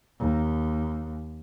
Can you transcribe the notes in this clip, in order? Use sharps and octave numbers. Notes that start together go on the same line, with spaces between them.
D#2